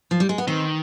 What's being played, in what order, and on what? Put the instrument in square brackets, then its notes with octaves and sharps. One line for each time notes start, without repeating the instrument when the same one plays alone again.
[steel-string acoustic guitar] F3
G3
G#3
B3
[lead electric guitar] D#3 [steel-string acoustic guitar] C4